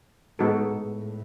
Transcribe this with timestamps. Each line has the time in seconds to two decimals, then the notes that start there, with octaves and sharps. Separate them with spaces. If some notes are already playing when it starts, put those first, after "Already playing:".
0.39 A2 G#3 B3 D#4 F#4 A4
0.75 A2